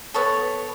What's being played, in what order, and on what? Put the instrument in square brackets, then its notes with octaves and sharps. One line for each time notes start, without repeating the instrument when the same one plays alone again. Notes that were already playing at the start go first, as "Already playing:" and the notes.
[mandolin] B3 A4 C#5